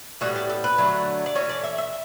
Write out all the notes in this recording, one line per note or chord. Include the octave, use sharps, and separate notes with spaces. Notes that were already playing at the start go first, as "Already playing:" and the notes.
A2 E3 G3 B3 F#4
G4
A4
B4
D3 F#3 A3
D5
E3 A3 C#4 C#5
D5
E5
E5